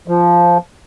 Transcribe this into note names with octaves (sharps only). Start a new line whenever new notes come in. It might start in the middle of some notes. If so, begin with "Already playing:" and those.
F3